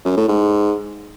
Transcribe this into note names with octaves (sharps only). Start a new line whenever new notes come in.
F#2
A2
G#2